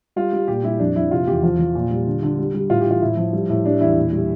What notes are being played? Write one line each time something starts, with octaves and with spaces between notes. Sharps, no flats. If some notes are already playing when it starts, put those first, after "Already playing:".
G3 F4
G3
A#2 G4
G3 E4
F2 D4
F2 E4
C3 F4
E2 G4
F3 F4
F3
A#2
G3
D3
D3
G3
G3
A2 F4
G4
E3 F4
A2 E4
F3
G3
A2
G3 D4
E2 E4
A#2
G3